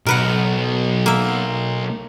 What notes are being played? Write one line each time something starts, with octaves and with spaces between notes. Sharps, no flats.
B1 A#4 B4 F#5
A#3 E5